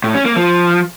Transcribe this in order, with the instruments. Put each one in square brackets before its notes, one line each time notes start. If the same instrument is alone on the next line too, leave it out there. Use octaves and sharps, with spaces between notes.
[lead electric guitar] A2
C#4
A#3
F3